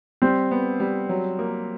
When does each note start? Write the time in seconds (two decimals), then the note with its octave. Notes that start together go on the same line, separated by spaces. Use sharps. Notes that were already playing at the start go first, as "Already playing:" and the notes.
0.22 G3 C4
0.51 B3
0.80 G3
1.09 F#3
1.39 A#3